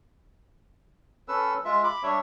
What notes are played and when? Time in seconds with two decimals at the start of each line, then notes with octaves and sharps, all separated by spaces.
1.28 C#4 A4 B4 E6
1.65 G#3 F4 E5
1.84 B5 D6
2.03 G3 D4 C#5 E5